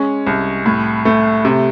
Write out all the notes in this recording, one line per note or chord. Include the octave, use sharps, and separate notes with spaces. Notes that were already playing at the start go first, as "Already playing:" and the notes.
Already playing: G#3 C#4
C2
A2
A3
C3